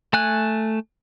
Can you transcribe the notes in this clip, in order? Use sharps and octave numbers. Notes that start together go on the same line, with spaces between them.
A3 G#5 F#6